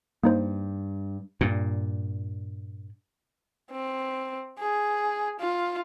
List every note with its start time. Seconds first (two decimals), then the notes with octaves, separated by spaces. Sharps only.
0.23 G2 A#3 D#4 C5
1.41 G2 A#2
3.71 C4
4.59 G#4
5.39 F4